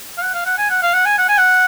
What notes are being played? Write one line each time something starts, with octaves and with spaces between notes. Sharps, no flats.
F5
F#5
F5
F#5
G#5
F#5
F5
F#5
G#5
F#5
G#5
F#5